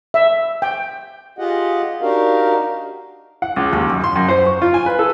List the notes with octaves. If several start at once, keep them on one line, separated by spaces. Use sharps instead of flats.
E5
G5
F4 G4 G#4 D#5 F#5
D4 D#4 F#4 G4 A#4 F5
F#5
C#2
D#2
F#2
C6
F#2
C5
C#6
F4
G#5
B4
A4